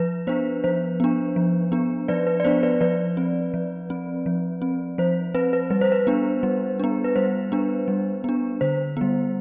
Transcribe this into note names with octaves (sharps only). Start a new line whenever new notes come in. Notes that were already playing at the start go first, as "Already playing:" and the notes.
Already playing: F3 B4
B3 D4 C5
F3 C5
B3 D4
F3
B3 D4
F3 B4 D5
B4
D5
B3 D4 C5
B4 D5
F3 B4 D5
C4
F3
C4
F3
C4
F3 C5
C4 B4
B4
G3 B4
C5
B4
B3 D4
G3
B3 D4
B4
G3 C5
B3 D4
G3
B3 D4
D3 C5
G3 B3